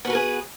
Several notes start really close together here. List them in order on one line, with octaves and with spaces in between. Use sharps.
B3 F#4 B4 A#4 G#4